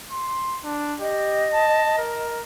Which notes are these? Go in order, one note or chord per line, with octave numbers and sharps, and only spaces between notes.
C6
D4
G4 D#5
A5
A#4